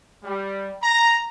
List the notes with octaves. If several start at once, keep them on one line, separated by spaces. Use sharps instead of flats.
G3
A#5